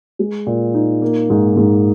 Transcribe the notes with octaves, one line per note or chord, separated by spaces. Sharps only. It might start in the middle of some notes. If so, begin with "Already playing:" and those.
G#3
A#2
D#4
A#3
G#2
G#2